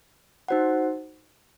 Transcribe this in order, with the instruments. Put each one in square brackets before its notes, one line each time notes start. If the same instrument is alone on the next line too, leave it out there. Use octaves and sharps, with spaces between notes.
[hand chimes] D#4 F#4 C5 F#5